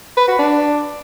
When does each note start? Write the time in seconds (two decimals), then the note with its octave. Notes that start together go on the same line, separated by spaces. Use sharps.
0.17 B4
0.28 F#4
0.39 D4